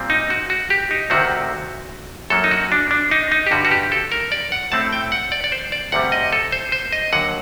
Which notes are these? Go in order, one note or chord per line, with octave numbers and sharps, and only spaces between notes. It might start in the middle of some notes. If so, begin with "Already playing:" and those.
Already playing: A#2 G3 C4
D#4
F#4
F#4
G4
D#4
D2 C3 D#3 A3 C4 F#4
F#2 F#3 A#3 A4
D#4
F#4
D4
D4
D#4
D#4
G4
G2 D3 G3 F#4
F#4
G4
A4
A#4
D5
F#5
A2 A3 C4 A5
G5
F#5
D5
D5
C5
D5
D2 C3 G3 F#5
D#5
A4
C5
C5
D#5
D#2 D3 F#3 F#5